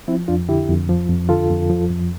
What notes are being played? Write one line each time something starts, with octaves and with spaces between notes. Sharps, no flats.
F3 C4 E4
F2 D4 F4
D3 E4 G4
F2
F3
F2
D3 F4 A4
F2
F3
F2